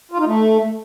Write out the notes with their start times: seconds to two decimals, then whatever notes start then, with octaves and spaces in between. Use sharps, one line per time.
0.12 F4
0.19 D#4
0.26 A3